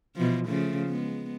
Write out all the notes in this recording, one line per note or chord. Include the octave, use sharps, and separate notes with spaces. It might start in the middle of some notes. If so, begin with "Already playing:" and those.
B2 E3 F3
C#3 F3 A3
G#3 B3